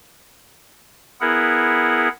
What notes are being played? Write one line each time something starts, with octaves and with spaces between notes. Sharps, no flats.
B3 E4 G#4 A#4 F#5